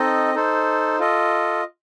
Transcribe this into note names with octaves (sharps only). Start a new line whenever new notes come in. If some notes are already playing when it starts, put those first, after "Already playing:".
Already playing: C4 D#4 A4 D#5
D#4 A4 C5
F4 A4 D#5